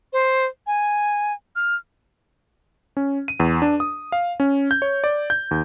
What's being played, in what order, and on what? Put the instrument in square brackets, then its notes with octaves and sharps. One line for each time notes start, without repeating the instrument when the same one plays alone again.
[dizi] C5
G#5
F6
[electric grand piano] C#4
D#7
E2
D4
D#6
F5
C#4
G6
C#5
D5
G6
D#2